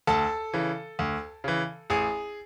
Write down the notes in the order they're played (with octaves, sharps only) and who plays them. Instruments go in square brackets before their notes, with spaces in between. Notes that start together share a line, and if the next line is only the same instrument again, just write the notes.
[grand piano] D2 A4 A5
C#3 E3
D2
C#3 E3
A1 G#4 G#5